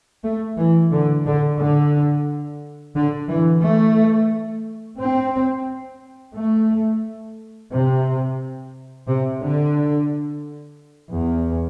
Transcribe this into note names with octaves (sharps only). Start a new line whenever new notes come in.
A3
E3
D3
D3
D3
D3
E3
A3
C4
A3
C3
C3
D3
E2